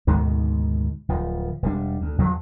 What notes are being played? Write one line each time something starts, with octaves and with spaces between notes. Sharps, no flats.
D2 G#2 B2 D#3
D1 F3
E1 G3 D4
D2
E2 G2 F3 F#3